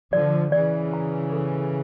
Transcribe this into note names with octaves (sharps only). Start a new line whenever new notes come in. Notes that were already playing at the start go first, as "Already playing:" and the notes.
D3 F3 D5
C#3 E3 D5
A#5
A4